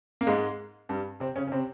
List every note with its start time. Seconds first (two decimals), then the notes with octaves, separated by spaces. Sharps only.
0.21 A#3
0.27 G#2 G#3
0.89 G2 G3
1.20 C3 C4
1.36 C#3 C#4
1.47 C#4
1.52 C3 C4